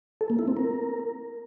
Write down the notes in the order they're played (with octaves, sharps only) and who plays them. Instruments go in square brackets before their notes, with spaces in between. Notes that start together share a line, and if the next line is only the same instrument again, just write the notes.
[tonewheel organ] A4
A#3
E4
C4
A#4